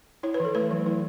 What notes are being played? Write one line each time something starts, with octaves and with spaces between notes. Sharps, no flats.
E4 C#5
B4
E3 A4
A3 B4
F#3
E4